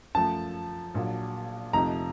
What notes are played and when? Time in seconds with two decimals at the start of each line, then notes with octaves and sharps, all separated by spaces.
0.15 F#2 F3 A3 A5
0.94 A#1 A#2 F#3
1.73 F2 C3 F3 A3 D#4 A#5